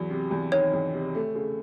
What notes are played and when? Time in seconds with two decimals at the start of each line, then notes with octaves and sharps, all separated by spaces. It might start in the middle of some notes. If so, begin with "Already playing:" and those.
Already playing: E2 F#3
0.10 C3
0.31 E2
0.52 D#3 C#5
0.73 E2
0.93 C3
1.15 A3
1.35 C#3